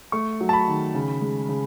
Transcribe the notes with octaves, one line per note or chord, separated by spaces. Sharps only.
A3 C#6
F#3
A5
B5
D#3
C#3
G#3
C#3